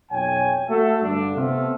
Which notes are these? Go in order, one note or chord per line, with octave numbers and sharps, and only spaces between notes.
B1 F2 C#5 G5 G#5
A3 F#4 A4
G2 D3 D4
C3 A3 B3 C4 F4 A4